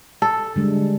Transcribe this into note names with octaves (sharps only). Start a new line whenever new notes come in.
A4
D3 G3 G#3